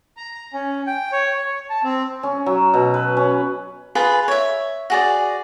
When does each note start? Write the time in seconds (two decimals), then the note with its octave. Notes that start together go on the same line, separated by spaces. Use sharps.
0.17 A#5
0.54 C#4
0.87 G5
1.12 C#5
1.34 C#5
1.70 A5
1.84 C4
2.23 C#4
2.46 F#3
2.74 B2
2.94 B4
3.17 C#4
3.95 F4 G#4 B4
4.28 C#5 E5
4.90 F#4 G#4 D5